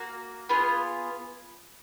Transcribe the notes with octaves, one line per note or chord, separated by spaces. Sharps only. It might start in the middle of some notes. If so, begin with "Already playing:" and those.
Already playing: A#3 F#4
B3 F4 G#4 B4